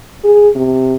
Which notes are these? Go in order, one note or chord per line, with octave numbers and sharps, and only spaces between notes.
G#4
C3